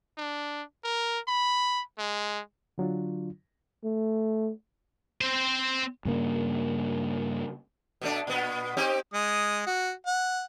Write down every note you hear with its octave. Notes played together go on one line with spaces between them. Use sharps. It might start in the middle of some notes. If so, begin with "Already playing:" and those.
D4
A#4
B5
G#3
D3 F#3 D4 F4
A3
C4 C5
G2 C#3 A#3
B2 A3 D4
A#2 B3
C4 D#4 G4
G#3 D#6
F#4
F#5